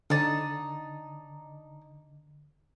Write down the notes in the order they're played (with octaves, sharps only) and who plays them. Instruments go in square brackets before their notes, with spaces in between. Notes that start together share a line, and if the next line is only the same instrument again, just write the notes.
[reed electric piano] D3 [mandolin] D#4 D5 A5